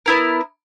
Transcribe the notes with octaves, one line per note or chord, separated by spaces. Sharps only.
B3 E4 A#4